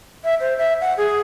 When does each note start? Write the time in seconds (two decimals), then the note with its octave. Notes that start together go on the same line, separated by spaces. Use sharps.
0.24 E5
0.41 C5
0.58 E5
0.81 F#5
0.98 G#4